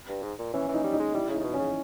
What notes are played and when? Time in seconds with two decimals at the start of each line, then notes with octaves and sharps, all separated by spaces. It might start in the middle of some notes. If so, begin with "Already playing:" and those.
0.09 G2
0.23 G#2
0.39 A#2
0.54 E3 C#4
0.69 E3
0.74 D#4
0.84 G3
0.93 D#4
0.99 G#3
1.14 G3 E4
1.28 C#3 E4
1.34 D#4
1.40 C#3
1.44 B2
1.54 C#4
1.59 C#3